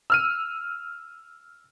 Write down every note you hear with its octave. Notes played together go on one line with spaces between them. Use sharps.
E6 F6 D#7